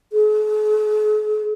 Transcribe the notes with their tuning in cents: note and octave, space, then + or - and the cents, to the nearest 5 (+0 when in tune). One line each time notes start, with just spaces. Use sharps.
G#4 +45